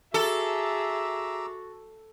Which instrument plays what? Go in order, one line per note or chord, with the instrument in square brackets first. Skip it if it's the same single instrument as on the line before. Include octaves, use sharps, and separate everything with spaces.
[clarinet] F#4 [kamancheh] G#4 E5 [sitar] A4 [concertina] A#5 D6 E6